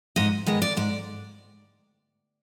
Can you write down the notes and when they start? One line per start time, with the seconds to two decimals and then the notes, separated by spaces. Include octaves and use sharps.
0.16 G#2 D#5
0.46 D#3 G#3 B3 D#5
0.62 D5
0.77 G#2 D5